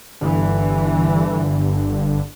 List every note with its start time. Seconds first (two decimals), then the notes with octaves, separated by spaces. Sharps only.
0.21 G1 G2 D3 E3